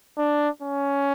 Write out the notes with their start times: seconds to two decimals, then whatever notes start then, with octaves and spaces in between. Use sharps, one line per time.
0.18 D4
0.62 C#4